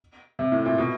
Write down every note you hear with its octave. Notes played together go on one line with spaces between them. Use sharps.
C3
A2
A#2
B2